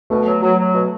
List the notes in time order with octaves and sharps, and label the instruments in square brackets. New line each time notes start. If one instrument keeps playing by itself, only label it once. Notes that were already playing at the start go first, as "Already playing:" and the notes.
[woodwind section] B2 [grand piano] A3
[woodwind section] F#3
F#3
F#3
B2